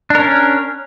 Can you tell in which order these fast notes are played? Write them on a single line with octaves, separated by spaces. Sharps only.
D4 A#4 C#4